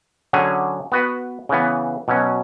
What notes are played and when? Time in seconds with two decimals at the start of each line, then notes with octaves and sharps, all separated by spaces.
0.33 D3 F#3 C#4 G#4
0.92 B3 F#4 B4
1.49 C#3 E3 B3
2.08 B2 F#3 C#4